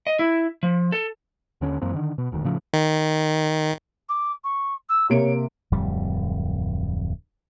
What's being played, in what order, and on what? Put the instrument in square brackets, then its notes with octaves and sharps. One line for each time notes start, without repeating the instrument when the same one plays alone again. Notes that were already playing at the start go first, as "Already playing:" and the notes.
[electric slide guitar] D#5
E4
F3
A4
[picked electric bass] D#2 D3 C#4
F#2 E3 A#3 C4
D3 D#3
B2
E1 D2 D#3
A2 C#3 F3 A3
[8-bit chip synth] D#3
[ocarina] D6
C#6
E6
[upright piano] C3 A#3 D7 [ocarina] C#5
[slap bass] D1 F2 G3